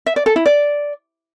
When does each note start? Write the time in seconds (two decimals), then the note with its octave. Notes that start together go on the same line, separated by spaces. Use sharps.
0.06 E5
0.16 D5
0.26 A4
0.36 E4
0.46 D5